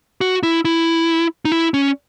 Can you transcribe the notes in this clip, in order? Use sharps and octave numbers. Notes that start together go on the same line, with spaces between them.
F#4
E4
E4
D#4
E4
C#4